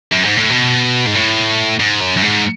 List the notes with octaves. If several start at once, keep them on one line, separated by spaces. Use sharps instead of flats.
F#2
G#2
A2
B2
G#2
A2
G#2
F#2
F#2
G#2